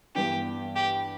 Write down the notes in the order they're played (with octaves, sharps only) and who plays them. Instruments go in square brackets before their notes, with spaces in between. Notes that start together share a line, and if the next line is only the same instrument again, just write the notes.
[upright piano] G2 E3 B3 D4 [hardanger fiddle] G4
[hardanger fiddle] G4